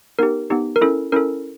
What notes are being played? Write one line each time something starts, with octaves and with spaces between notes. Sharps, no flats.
B3 D#4 G4 A#4
B3 D#4 G4
A#4
C#4 E4 A4
C#4 E4 A4 A#4